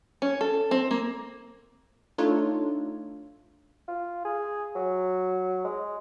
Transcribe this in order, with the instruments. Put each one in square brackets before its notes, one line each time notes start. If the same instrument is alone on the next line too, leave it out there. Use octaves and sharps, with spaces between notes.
[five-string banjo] C#4
A4
C4
A#3
[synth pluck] A3 D4 D#4 F4 A4 C#5
[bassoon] F4
G#4
F#3
G#3